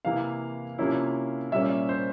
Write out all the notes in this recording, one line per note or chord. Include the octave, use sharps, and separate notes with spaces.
C3 E3 A#3 E4 F5
C3 F3 A#3 C#4 E4
A#2 G3 A#3 C#4 E5
C5